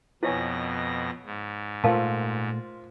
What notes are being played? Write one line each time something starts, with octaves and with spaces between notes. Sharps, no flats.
F2 B2 E4 B4 C#5 G#5 A#6
G#2
A#2 A3 F4 A#4 C5 F5 F#5 A5